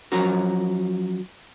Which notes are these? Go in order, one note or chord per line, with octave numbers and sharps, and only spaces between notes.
F3 F#3 C#4 F#4 A#4